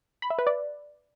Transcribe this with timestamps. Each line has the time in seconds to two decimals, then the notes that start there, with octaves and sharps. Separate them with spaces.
0.22 B5
0.30 E5
0.39 B4
0.47 D5